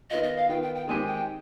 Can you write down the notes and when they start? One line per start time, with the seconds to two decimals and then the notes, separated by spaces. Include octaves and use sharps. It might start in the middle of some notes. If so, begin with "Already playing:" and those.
0.10 D#3 B3 F4 D#5
0.23 D#5
0.37 F5
0.49 D#3 B3 F4 G5
0.62 G5
0.75 G5
0.88 D#3 G#3 C4 D#4 G4 G#5
1.07 G5